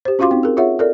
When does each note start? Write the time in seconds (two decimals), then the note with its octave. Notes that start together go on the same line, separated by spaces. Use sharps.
0.05 G4 C5
0.19 C#4 F4 F#4 F5 C6 D6
0.31 C4 D#4
0.43 G#4 A#4
0.57 F4 G#4 C#5 E5 F#5
0.79 A4 A#4 D5